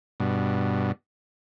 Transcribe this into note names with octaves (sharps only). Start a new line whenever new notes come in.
G2 B2